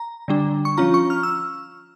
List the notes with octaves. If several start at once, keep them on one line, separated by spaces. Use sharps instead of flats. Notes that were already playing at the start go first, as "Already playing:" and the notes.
Already playing: A#5
D3 G3 D4
C#6
F3 C#4 F4 A#5
C#6
F6
E6